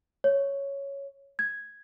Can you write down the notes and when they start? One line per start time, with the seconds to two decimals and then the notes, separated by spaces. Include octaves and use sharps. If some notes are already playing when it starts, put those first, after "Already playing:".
0.24 C#5
1.39 G#6